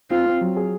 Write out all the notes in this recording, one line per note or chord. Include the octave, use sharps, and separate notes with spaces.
C4 F4
C4
F#3
G#4